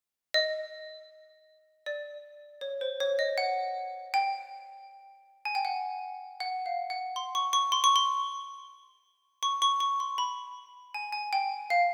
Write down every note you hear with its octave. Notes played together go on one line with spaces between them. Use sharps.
D#5
D5
C#5
C5
C#5
D#5
F#5
G5
G#5
G5
F#5
F#5
F5
F#5
C6
C#6
C#6
C6
C#6
C6
C#6
C#6
C#6
C6
B5
G#5
G#5
G5
F5